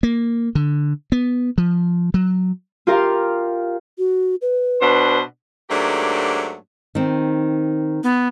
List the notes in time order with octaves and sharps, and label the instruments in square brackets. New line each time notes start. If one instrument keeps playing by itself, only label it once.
[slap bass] A#3
D3
B3
F3
F#3
[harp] F4 G4 A#4 F5
[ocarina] F#4
B4
[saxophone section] B2 D4 C5
G#2 F#3 A3 A#3 D4 G4
[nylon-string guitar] D#3 C4
[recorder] B3